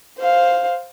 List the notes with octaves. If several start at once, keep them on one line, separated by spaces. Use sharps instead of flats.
C5 F5